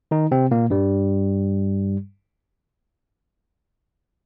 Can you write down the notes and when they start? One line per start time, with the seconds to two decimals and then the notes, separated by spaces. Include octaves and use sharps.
0.11 D#3 D#4
0.31 C3 C4
0.51 A#2 A#3
0.70 G2 G3